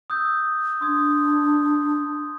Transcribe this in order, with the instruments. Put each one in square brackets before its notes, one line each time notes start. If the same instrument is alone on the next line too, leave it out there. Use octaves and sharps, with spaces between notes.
[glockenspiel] D#6 E6 G6
[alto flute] D4 [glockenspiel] C6 D#6 G#6